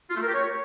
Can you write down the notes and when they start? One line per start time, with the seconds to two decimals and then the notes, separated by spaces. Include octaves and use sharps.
0.09 F4
0.15 A3
0.22 A#4
0.28 G4
0.34 C#5